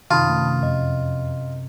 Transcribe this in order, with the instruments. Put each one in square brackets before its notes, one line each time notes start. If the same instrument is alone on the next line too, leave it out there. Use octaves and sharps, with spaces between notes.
[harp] F#2 C3 C#4 [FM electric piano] D#3 [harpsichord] F4 [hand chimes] A5 B5 D#6
[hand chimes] A3
[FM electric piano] F2 [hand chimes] D#5